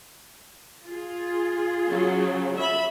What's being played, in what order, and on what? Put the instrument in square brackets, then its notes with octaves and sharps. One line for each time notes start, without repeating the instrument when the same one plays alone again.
[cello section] F4 G#4
[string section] C#3 F#3
E5 B5